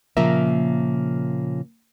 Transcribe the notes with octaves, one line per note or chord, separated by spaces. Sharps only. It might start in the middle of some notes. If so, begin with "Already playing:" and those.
A#2 C#3 F3 A#3 A#4 E5